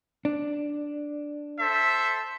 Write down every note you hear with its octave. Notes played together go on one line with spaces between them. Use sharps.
D4
A4 C5 E5